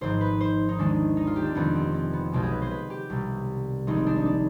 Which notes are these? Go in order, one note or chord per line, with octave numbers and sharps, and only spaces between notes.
G#1 G#2 F3 C5
B4
C5
D#4
D#2 D#3 G#3 D4
D#4
F4
G4
C4 D4
F1 F2 D#3 G#3 B3
C4
C4
B3
B1 B2 G#3 G4
G#4
B4
C5
B4
G4
C2 B2 G3
G#1 G#2 F3 G#3 D#4
C4
D4
D#4
D4